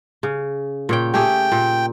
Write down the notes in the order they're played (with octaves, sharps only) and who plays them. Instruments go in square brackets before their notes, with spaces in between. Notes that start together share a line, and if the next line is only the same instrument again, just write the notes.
[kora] C#3
A#2 C#5 G5
[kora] A3 G4 G#4 [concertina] G5
[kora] A#2